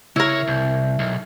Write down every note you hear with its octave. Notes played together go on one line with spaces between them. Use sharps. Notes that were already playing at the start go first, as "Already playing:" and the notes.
C#3 E4 A#4 C#5
C2
B1